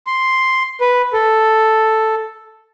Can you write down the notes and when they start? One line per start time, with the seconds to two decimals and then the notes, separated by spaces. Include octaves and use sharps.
0.07 C6
0.81 B4
1.13 A4